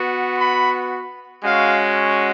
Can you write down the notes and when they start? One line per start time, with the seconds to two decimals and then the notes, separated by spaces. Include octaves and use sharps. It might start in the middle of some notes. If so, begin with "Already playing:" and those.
Already playing: B3 F#4
0.38 B5
1.44 G#3 C#4 F#4 F5